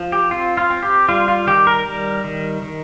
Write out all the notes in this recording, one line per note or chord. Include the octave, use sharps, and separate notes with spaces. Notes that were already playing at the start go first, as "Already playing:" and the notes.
Already playing: F3
G4
C4 F4
F4
C4
G4
G3 F4
F4
D#3 G4
A#4
G3
D#3
D#3